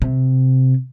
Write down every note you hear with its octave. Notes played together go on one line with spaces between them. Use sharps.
C3